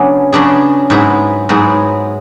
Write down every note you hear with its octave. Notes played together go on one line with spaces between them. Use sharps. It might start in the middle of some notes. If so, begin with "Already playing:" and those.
Already playing: C#3 F#3 B3 D4 G#4
C#3 F#3 B3 D4 G#4
G#2 F#3 B3 E4 G#4
G#2 F#3 B3 E4 G#4